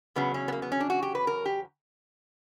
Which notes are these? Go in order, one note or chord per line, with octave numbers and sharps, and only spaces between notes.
E2 C#3 F#3 B3
C#4
B3
A#3
B3
C#4
D4
F#4
G4
B4
A#4
G4